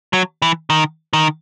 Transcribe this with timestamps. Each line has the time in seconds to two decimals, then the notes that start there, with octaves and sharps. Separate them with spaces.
0.13 F#3
0.42 E3
0.70 D#3
1.13 D#3